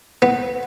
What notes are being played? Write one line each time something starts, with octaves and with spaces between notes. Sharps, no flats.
B3